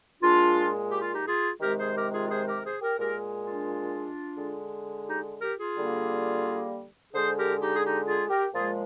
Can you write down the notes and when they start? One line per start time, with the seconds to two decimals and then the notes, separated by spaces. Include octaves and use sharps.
0.21 A#2 G#3 D4 F4
0.90 G4
1.01 F4
1.12 D#4 G4
1.25 F4 G#4
1.60 C3 D#3 G#3 G4 A#4
1.77 G#4 C5
1.95 G4 A#4
2.12 F4 G#4
2.29 G#4 C5
2.46 G4 A#4
2.64 G#4 C5
2.82 G4 A#4
2.98 A#2 G#3 G4 A#4
3.44 D4 F4
4.37 D3 G#3
5.06 D#4 G4
5.41 G4 A#4
5.58 F4 G#4
5.76 D3 G3 A#3
7.14 D3 G#3 G#4 C5
7.36 G4 A#4
7.60 D#4 G4
7.76 G#4
7.83 D#4 G4
8.06 F4 G#4
8.29 G4 A#4
8.52 A#2 F3 G#3 F4 G#4